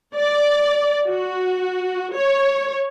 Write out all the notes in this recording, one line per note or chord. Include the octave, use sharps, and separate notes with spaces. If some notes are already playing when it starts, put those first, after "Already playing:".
D5
F#4
C#5